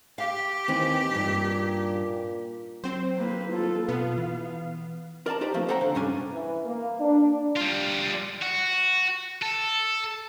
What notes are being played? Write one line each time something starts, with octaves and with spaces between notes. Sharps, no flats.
G4 F5
D#2 D#3 E3 C4
G2 A#2 D#4
F#3 C4 C5
A#3 B4
F4 A4
B2 B3 F5
E3
A#4 D5 F5 A5 A#5
D#4 G4 B4 C5 D5
F3 A3 A#3 C4
A4 C5 C#5 F#5 G5 A#5
D3 F5
C2 G2 G3 C#4 D4 G#5
E3
A#3
D4
G3 F4
F#4
A4